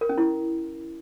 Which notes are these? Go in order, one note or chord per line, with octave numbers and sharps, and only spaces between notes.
A#4
C#4
E4